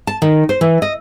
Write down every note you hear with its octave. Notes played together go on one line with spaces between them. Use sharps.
A5
D#3
C5
E3
D#5